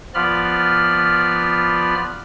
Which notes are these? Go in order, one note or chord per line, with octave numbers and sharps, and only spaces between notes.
F3 B3 F4 D5 B5 F6